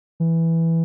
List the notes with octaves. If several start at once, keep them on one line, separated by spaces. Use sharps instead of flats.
E3